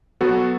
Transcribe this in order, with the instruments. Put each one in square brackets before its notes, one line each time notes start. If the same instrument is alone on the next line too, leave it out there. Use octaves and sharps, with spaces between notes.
[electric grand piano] F#3 B3 F#4 A4